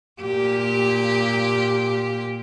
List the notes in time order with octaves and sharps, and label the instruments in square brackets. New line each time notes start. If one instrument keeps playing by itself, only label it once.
[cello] A#2 G4